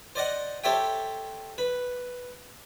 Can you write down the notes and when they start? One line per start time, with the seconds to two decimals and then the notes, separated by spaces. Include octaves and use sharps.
0.15 C5 D5 D#5 F#5
0.64 G4 A4 C5 C#5 E5 G5
1.58 B4